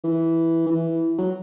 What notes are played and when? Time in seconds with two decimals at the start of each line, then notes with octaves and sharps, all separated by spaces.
0.04 E3
0.66 E3
1.18 F#3